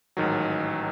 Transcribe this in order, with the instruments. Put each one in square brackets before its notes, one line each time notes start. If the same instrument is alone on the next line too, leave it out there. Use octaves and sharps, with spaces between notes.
[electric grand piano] A1 G#2 D#3 F#3